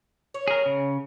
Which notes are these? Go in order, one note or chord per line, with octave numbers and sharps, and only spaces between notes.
C#5
G#4 A#4
C#3